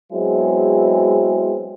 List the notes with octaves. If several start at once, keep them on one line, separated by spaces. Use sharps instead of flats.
F#3 G#3 B3 C4 E4 G#4